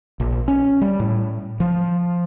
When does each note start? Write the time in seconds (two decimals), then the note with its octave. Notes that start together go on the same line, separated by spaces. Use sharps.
0.20 A#1
0.48 C#4
0.81 G3
1.00 A2
1.60 F3